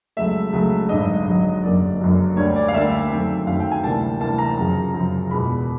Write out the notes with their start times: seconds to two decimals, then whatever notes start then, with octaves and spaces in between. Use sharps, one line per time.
0.17 C#2 C#3 F#3 A3 E5
0.53 C#2 C#3 F#3 A3
0.89 G#1 G2 D3 F#3 D#5
1.26 G#1 G2 D3 F#3
1.64 F#1 F#2 D3 F#3 A#3 D5
2.00 F#1 F#2 D3 F#3 A#3
2.36 D2 D3 G3 A#3 D4 C#5
2.56 D5
2.68 F5
2.73 D2 D3 G3 A#3 D4 E5
3.11 F#2 D#3 F#3 A3 C4
3.47 F#2 D#3 F#3 A3 C4 F5
3.60 G5
3.72 G#5
3.84 D2 C3 E3 G3 A#3 A5
4.21 D2 C3 E3 G3 A#3 A5
4.38 A#5
4.58 F#2 C#3 F3
4.94 F#2 C#3 F3
5.31 E2 B2 G#3 B5